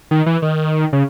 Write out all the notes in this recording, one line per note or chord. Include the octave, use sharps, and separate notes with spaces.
D#3
E3
D#3
C#3